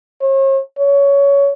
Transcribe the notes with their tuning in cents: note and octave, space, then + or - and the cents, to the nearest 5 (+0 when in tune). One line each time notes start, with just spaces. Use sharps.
C#5 -45
C#5 +15